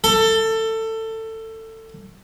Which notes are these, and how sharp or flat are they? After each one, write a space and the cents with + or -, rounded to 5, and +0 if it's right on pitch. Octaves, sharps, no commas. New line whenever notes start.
A4 +20